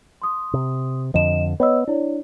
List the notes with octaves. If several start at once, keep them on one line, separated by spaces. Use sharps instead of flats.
C6 D#6
C3
F2 D3 F3 D#5 E7
B3 C#5 D#5 E6
D4 E4 C#5